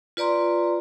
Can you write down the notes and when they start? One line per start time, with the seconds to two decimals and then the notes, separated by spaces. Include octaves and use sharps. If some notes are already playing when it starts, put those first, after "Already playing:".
0.17 F4 B4 D5 A#5 C6